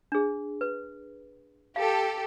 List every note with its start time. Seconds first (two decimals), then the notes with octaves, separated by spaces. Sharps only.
0.12 D4 G#4
0.61 B4
1.76 G4 A4 F5